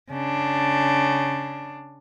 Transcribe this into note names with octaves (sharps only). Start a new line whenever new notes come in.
C#3 D4